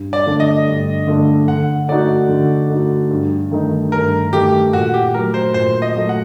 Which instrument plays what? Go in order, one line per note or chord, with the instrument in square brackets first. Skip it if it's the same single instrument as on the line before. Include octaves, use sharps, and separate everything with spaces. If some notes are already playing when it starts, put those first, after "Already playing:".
Already playing: [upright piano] G2
[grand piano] D5
[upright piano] D3 A3 D4
[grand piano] D#5
[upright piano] G2
D3 A3 D4
[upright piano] D3 [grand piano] F#5
[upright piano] A3 D#4 F#4 [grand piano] D5
[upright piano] D3
A3 D#4 F#4
G2
D#3 A3 D#4
[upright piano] G2 [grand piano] A#4
[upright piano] D#3 A3 D#4 [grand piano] G4
[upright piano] A#2 [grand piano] F#4
[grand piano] G4
[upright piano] F#3 A3 [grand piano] A#4
[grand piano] C5
[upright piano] A#2 [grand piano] C5
[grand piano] D#5
[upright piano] F#3 A3
[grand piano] F#5